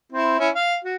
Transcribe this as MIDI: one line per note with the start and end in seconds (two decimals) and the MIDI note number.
0.12 0.35 60
0.12 0.35 64
0.39 0.49 61
0.39 0.49 64
0.39 0.49 76
0.55 0.77 77
0.84 0.96 66